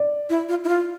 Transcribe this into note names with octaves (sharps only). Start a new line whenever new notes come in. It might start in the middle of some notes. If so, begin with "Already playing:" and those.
Already playing: D5
E4
F4
E4
F4